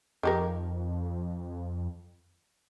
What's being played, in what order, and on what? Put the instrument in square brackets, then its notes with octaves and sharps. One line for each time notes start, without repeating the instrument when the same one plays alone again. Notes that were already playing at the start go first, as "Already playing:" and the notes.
[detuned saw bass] F2 [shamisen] D#3 G4 A#4